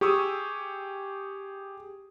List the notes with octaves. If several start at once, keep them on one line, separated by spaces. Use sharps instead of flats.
G4 G#4 C#6 D#6 E6